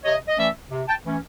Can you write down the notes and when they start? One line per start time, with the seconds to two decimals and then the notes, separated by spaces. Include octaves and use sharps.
0.04 C3 C#5 D#5
0.28 D#5
0.38 E3 A3 C#4 D5 E5
0.71 C3
0.88 G5 A5
1.05 E3 A3 C#4